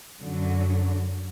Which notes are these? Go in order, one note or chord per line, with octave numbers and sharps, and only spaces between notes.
F#2 D3 F#3